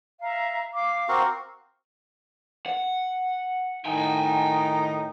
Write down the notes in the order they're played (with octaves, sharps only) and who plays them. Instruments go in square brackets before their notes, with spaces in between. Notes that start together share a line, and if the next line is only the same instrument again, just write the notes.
[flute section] E5 F5 A#5
F5 D6
[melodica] C4 F#4 A#4
[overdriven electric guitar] F#5
[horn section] A2 D#3 D#4 [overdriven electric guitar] G5 G#5